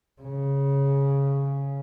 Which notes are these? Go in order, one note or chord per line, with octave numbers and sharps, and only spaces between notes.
C#3